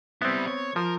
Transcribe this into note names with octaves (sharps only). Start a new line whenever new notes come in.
G3 B3 C4 E4
C#5
F3 A#4